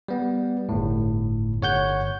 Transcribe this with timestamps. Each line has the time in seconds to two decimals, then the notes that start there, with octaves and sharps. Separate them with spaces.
0.08 G3 B3
0.69 G1 A2
1.61 G1 C#5 F#5 G6